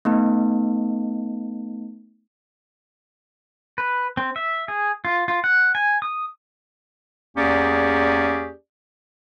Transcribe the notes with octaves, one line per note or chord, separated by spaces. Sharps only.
A3 B3 D#4
B4
C4
E5
G#4
F4
F4
F#5
G#5
D#6
E2 A#3 C#4 G4 G#4 D5